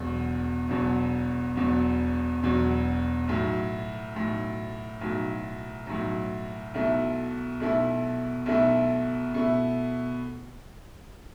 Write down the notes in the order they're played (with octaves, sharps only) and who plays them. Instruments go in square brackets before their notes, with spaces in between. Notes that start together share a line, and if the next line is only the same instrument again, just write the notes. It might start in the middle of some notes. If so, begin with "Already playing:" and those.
Already playing: [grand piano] E1 E2 B2 F#3
E1 E2 B2 F#3
E1 E2 B2 F#3
E1 E2 B2 F#3
B1 A2 F#3
B1 A2 F#3
B1 A2 F#3
B1 A2 F#3
B1 B2 A3 E4
B1 B2 A3 E4
B1 B2 A3 E4
B2 A3 E4